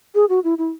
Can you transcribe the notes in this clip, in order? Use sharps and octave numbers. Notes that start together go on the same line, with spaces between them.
G#4
F#4
E4
E4